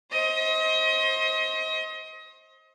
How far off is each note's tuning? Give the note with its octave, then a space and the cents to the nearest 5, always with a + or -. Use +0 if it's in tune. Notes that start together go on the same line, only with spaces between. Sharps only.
C5 +25 D#5 +35